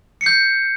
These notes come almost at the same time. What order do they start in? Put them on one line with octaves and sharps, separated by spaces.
C#7 C7 G6